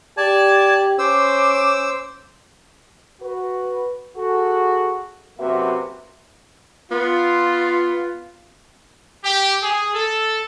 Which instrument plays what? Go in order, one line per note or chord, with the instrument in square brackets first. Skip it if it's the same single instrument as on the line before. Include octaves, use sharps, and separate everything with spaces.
[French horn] G4 [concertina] D5 A5 [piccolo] G#6
[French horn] C#4 [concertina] C5 E6 [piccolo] D6
[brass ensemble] F#4 B4
F#4 G#4 A4
F#2 C3 A#3 F#4 B4 E5
[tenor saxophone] B3 [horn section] F4
[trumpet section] G4
G#4
A4